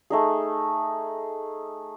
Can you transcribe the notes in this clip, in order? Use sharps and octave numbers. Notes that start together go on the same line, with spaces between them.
A3 D#4 G#4